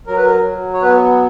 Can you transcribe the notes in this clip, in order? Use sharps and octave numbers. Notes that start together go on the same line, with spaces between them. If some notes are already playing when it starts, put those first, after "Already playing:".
F#3 A#4
B4
A#4
F#3
C#5
B3 B4